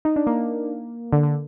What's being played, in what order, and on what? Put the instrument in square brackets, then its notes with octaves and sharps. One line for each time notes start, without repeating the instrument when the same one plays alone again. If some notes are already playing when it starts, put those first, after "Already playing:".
[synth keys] D#4
D4
A#3
D3
D3